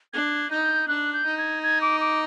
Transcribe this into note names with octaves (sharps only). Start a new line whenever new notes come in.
D4 G#6
D#4 G6
D4 F#6
G6
D#4
G#6
G#6
D6
D6